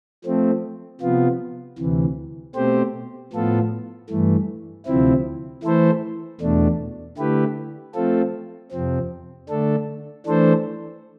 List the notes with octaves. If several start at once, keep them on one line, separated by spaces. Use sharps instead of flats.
F3 A3 C4
C3 F3 B3 F4
D2 C3 E3
B2 A3 C4 G4 C5
A2 F3 B3 F4 A4
G2 E3 A3
D2 C3 F3 C4 E4
E3 A3 E4 A4 C5
E2 B2 A3 D4
D3 A3 E4 G4 B4
F3 A3 C4 F4 A4
F2 C3 F3 C4
D3 A3 D4 A4
E3 A3 D4 A4 C5